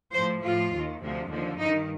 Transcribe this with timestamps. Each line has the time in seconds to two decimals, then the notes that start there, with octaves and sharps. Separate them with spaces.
0.13 A2 F3 C5
0.42 A2 F3 F4
0.71 D#2 D#3
1.00 D2 C3 F3
1.29 D#2 D3 F3
1.58 G2 D#4
1.62 D#3